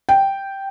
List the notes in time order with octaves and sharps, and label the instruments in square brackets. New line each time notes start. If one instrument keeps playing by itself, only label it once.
[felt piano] G5